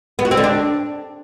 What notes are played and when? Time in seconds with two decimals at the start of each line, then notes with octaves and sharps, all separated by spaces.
0.19 B3
0.25 F#4
0.31 C4
0.37 D3
0.44 D4